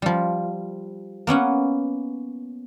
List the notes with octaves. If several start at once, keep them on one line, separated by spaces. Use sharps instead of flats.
F3 G3
A#3 B3 C#4 F#5